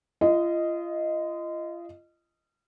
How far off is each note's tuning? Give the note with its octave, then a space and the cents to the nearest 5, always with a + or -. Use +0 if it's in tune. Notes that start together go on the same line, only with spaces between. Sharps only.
F4 -35 D#5 +0